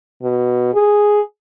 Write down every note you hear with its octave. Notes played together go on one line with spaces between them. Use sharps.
B2
G#4